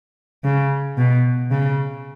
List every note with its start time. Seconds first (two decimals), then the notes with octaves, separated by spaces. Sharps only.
0.44 C#3
0.98 B2
1.51 C#3